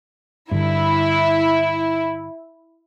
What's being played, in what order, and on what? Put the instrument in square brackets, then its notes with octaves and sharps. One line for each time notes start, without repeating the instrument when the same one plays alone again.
[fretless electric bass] G2 D3 [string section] E4